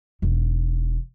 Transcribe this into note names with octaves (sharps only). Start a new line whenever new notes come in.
E1 D#3